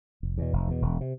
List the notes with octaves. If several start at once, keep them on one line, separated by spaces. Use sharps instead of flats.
F1
E2 B2
F1
E2 B2
E1
C3